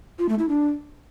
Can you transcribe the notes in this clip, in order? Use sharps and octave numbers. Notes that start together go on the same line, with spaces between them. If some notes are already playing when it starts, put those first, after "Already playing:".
F4
A3
E4
D4